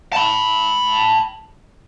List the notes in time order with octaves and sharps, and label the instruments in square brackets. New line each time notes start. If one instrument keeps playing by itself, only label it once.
[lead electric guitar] A5 B5